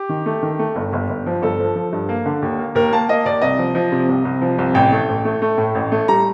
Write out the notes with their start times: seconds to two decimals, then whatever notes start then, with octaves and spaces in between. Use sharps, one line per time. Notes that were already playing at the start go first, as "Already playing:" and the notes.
Already playing: G4
0.09 D#3
0.26 A3
0.43 D#3
0.59 A3
0.76 G1
0.93 G1
1.09 G1
1.26 F3
1.42 G1 A4
1.59 F3
1.76 F3
1.93 G2
2.09 A#3
2.26 D3
2.42 D#2
2.59 A#3
2.75 D#2 A#4
2.92 A#3 A5
3.09 A#3 D#5
3.25 D#2 D5
3.42 C2 D#5
3.59 F3
3.75 F3
3.92 C3
4.09 C2
4.25 C2
4.41 F3
4.58 C2
4.74 A1 G5
4.92 A3
5.08 A1
5.25 A3
5.42 A3
5.58 A2
5.75 A1
5.92 A3
6.08 G3 A#5